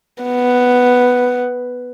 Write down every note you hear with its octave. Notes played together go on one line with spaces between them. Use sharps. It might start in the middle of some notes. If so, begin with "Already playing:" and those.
B3